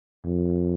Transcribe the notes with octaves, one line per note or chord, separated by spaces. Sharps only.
F2